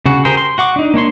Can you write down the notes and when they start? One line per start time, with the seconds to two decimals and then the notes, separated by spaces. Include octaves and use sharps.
0.06 C#3 F#4
0.25 G4 G#4 A#4 C5 G5
0.37 C6
0.58 F#4 F#5 C#6 D6
0.76 D4 D#4
0.94 A#3 D4 C#5 C6